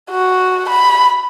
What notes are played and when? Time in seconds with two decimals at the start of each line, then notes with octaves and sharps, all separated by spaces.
0.10 F#4
0.69 B5